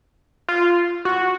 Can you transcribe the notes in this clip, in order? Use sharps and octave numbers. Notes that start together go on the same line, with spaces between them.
F4
F#4